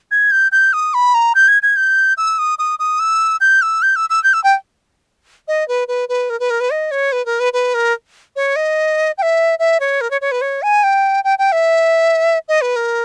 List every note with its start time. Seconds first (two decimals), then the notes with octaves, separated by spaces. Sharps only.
0.11 G#6
0.31 G6
0.52 G6
0.73 D#6
0.94 B5
1.14 A#5
1.35 G6
1.48 G#6
1.63 G#6
1.76 G6
2.17 E6
2.39 D#6
2.59 D#6
2.79 D#6
2.99 E6
3.41 G6
3.62 E6
3.82 G6
3.96 E6
4.10 E6
4.24 G6
4.33 E6
4.44 G5
5.48 D#5
5.68 B4
5.88 B4
6.09 B4
6.30 A#4
6.40 B4
6.50 A#4
6.60 B4
6.70 D#5
6.91 C#5
7.12 B4
7.26 A#4
7.40 B4
7.53 B4
7.74 A#4
8.36 C#5
8.56 D#5
9.18 G5
9.22 E5
9.59 E5
9.80 C#5
10.01 A#4
10.11 C#5
10.21 C#5
10.31 B4
10.41 C#5
10.62 G#5
10.83 G5
11.24 G5
11.39 G5
11.52 E5
12.48 D#5
12.61 B4
12.76 A#4